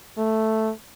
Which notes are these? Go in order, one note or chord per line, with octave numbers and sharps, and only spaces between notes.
A3